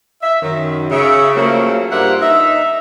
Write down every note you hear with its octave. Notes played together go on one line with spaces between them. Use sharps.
E5
F#2 D#3
C#3 E5
C#3 F3 F#3 A3 A#3
G2 F3 A#3 C5 E5 F#5
D#4 E5